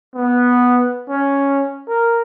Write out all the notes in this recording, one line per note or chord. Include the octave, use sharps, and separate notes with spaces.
B3
C#4
A#4